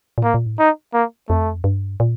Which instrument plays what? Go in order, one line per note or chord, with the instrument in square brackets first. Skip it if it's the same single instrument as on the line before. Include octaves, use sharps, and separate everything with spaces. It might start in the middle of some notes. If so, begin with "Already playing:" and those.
[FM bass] A#2
[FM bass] A2 [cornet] A#3
[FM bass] A#2
A2
[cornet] D#4
A#3
[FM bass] F2 [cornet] A3
[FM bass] G2
A#2